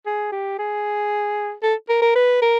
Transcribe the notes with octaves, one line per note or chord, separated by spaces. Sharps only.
G#4
G4
G#4
A4
A#4
A#4
B4
A#4